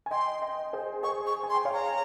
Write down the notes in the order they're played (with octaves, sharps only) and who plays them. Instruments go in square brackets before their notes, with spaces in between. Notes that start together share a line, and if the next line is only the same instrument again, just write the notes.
[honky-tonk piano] G#5
[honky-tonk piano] D#5 G5 [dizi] C6
[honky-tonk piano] D#5 G5
G#4 C5
[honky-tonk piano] G#4 C5 [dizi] C#6
[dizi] C#6
[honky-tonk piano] G#5
[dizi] C6
[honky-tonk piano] G5
C#5 F5
[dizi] A#5